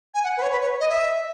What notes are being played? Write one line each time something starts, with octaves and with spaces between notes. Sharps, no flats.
G#5
F#5
B4
C#5
B4
C#5
D#5
E5